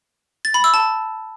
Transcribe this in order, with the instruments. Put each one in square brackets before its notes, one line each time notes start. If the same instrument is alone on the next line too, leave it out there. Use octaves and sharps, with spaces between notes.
[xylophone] A6
B5
E6
A5